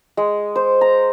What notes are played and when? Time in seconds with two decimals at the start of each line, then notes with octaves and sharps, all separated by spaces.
0.17 G#3
0.55 C5
0.81 A#5